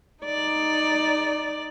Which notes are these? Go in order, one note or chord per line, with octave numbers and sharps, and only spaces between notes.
D#4 D5